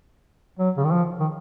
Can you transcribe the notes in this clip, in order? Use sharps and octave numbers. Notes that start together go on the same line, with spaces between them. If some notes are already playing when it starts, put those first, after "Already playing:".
F#3
C#3
D#3
F3
D#3